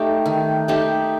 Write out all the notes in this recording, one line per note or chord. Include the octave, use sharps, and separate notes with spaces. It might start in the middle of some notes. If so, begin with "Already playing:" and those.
Already playing: A3 D#4 G4
D#3
A3 D#4 G4